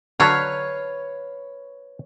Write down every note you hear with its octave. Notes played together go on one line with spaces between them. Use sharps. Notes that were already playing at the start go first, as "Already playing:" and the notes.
D3 F#3 A4 B4 C#5 F5